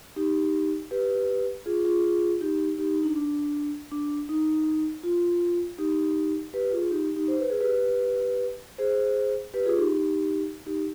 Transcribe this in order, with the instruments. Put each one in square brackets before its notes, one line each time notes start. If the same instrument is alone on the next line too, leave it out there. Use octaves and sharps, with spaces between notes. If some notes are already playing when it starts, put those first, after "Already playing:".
[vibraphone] D#4 G4
G4 B4
F4 G#4
F4 G#4
F4 G#4
D#4 G4
D#4 G4
D#4
D4
D4
D4
D#4
F4
D#4 G4
G4 B4
F4 G#4
D#4 G4
D#4 G4
C5
B4
G#4
G4 B4
G#4 C5
G4 B4
F4 G#4
D#4 G4
D#4 G4